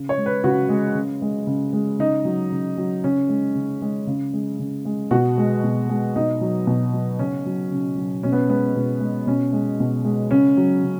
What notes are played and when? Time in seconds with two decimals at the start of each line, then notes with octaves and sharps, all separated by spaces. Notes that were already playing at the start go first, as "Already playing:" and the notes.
Already playing: C#3
0.09 C#5
0.17 G#3
0.26 B4
0.44 C#3 F#4
0.69 G#3
0.95 C#3
1.22 G#3
1.47 C#3
1.73 G#3
1.99 C#3 D#4
2.25 F#3
2.52 C#3
2.78 F#3
3.04 C#3 C#4
3.29 G#3
3.55 C#3
3.82 G#3
4.07 C#3
4.33 G#3
4.59 C#3
4.85 G#3
5.11 B2 F#4
5.38 G#3
5.64 B2
5.89 G#3
6.16 B2 D#4
6.41 F#3
6.67 B2
6.93 F#3
7.19 C#3 C#4
7.46 F#3
7.72 C#3
7.97 F#3
8.23 B2 C#4
8.32 B3
8.50 G#3 B3
8.76 B2
9.01 G#3
9.27 B2 C#4
9.53 G#3
9.80 B2
10.05 G#3
10.31 C#3 C#4
10.57 F#3
10.83 C#3